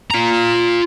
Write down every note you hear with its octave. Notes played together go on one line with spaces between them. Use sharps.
F4 A#5